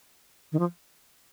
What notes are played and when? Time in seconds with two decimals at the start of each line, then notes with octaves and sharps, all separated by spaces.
0.52 D#3
0.59 F3